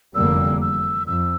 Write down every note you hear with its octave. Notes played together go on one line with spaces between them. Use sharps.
F1 E2 D3 G3 A#3 E6
E6
F2 E6